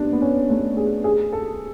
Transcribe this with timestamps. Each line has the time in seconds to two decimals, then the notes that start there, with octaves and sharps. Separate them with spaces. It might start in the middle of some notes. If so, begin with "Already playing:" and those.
Already playing: B3 D4
0.13 B3
0.21 C#4
0.50 A3
0.77 G#4
1.04 G#4
1.32 A4